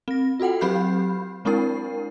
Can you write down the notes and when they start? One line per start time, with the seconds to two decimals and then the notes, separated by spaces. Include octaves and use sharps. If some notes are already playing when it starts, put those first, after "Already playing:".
0.08 C4 A#6
0.40 F4 F#4 A4 F#5 G5
0.61 F#3 C4 G4 B5 G6 C7
1.45 G#3 C4 D4 E4 A#4 C7